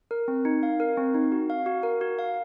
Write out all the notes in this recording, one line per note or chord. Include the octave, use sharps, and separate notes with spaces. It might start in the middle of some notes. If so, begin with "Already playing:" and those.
A#4
C4
D#4
F5
A#4
C4
D#4
F#4
F5
F#4
A#4
F#4
F5